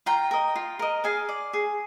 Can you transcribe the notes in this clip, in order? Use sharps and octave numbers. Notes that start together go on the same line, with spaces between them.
F4 G5 A#5
A#4 D#5
F4
A#4 D#5
G#4 F5 G#5
D5
G#4